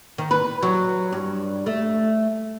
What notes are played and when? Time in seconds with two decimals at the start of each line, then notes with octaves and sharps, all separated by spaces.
0.18 D#3
0.31 B4
0.63 F#3
1.12 G2
1.66 A3